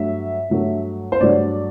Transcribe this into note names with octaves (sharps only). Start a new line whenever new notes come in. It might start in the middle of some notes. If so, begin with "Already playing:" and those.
Already playing: G2 F#3 A3 E5
G2 F#3 A3
C5
G2 F#3 A3 D5